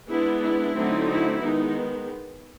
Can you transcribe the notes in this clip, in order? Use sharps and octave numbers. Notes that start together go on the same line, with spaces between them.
G#3 B3 D4 E4
E4
D3 F#3 A3 C4 D#4
E4
D#3 G#3 B3 D#4